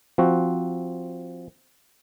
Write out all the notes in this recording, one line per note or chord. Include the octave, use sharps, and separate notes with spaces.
F3 C4 F#4